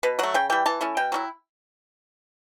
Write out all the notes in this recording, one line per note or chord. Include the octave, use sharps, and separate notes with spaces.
B2 B4
F#3 A3 F#5
C#3 G5
E3 G3 G5
E3 A5
A3 C#4 E4
B2 G5
F#3 C#4 E4